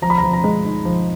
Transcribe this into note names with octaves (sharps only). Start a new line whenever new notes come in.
F3 A#5
B5
A#5
F3
A#5
G#3
D#4
F3